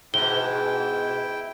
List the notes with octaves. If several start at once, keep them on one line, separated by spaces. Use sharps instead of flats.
G#2 B2 E4 G5 G7